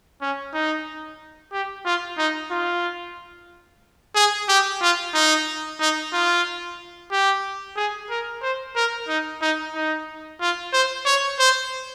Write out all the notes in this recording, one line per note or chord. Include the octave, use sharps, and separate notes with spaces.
C#4
D#4
G4
F4
D#4
F4
G#4
G4
F4
D#4
D#4
F4
G4
G#4
A#4
C5
A#4
D#4
D#4
D#4
F4
C5
C#5
C5